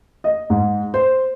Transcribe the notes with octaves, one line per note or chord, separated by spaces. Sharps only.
D#5
G#2
C5